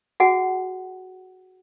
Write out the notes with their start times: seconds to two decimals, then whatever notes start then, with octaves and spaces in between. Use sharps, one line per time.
0.20 F#4 G#4 F#5 G#5